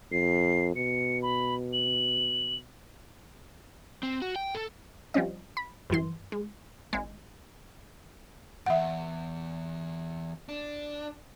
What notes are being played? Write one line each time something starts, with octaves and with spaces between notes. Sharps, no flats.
F2 C7
B2 C#7
B5
F#7
C4
F#4
G5
A4
F3 G3 C4 C#4 D#5
B5
G1 F#2 E3 C6
G#3
G#1 G#3
E2 G2 E5 F#5
D4